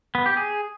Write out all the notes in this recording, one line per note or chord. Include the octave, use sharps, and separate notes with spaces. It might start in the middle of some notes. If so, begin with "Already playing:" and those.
B3
G4
G#4